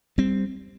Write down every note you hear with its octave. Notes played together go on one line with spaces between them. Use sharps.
G3 C4